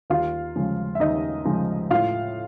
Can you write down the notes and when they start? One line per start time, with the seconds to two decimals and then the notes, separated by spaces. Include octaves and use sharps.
0.10 D#2 F4 F5
0.56 C#3 F3 G#3
0.95 E5
1.00 D#2 D#4 D#5
1.45 C#3 F3 G#3
1.90 A2 F4 F5